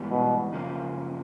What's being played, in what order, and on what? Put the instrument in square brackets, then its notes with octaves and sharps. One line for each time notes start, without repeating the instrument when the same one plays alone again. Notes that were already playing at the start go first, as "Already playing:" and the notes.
Already playing: [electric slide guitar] G#2 E3 G3 B3
[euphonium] B2
[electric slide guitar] F#2 C#3 F3 A#3